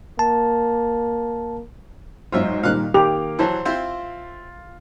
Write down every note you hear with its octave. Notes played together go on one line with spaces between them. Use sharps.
A#3 A5
G#2 F#3 F4 C5 E5
A#2 D#3 G3 F5 F#6
D#3 A#3 G4 D6 F7
E3 F#3 C5 A5
C4 E4 F4 C5